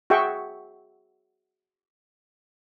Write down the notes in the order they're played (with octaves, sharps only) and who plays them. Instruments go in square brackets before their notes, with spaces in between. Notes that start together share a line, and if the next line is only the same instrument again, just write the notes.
[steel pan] F#4 G#4 E5 G5 C#6